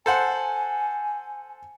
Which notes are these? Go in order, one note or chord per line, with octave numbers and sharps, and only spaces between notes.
A4 C5 F#5 G#5